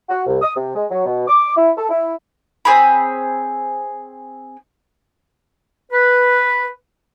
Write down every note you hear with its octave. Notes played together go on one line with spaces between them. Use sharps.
F#4
C2
D#6
C3
G#3
F#3
B2
D6
E4
A4
E4
C4 G#4 C#5 B5
B4